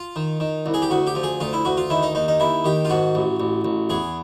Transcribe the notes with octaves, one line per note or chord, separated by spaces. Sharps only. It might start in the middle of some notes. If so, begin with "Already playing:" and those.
Already playing: F4
D#3
D#3
C2
G#4
G4
D2 F#4
G4
F3
G#4
D2 F4
E4
D2 F#4
F4
D#3 E4
D#4
D#2 D#4
D#4
D#2 E4
D#3 G4
F4
G#2 F#4
A1
A1
A1
E2 G#4